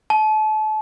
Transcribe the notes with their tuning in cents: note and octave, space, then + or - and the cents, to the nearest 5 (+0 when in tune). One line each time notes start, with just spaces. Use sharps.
A5 -35